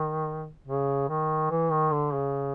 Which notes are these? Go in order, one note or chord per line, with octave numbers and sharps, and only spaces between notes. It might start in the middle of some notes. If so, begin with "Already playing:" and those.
Already playing: D#3
C#3
D#3
E3
D#3
D3
C#3